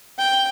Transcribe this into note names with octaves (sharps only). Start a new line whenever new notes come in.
G5